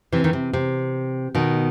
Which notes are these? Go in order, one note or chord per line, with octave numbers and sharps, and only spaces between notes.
C3 E3
D#3
C3
C3
B2 D#3